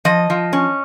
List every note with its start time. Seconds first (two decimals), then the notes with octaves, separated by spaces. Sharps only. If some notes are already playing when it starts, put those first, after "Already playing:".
0.05 F3 D#5
0.30 F3
0.53 C#4